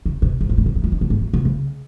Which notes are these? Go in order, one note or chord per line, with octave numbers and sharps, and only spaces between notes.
C#3
B2
G#2
A#2
B2
C#3
D#3
F3
D#3
B2
G#2
A#2
B2
C#3